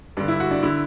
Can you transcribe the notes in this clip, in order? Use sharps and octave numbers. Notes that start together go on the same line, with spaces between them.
G2 D3 D4
E4
F#4
D4
D3 E4